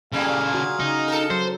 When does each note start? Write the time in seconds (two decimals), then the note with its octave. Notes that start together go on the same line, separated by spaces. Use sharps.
0.13 C#3 G3 A#3 G#4 A4 F5
0.41 A#2
0.54 F#4
0.80 C#3 D#4
1.08 A4 A#4
1.30 F#3 C5